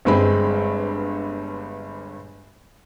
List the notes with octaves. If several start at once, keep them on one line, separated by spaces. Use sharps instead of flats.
G1 G2 G#3 C4 B5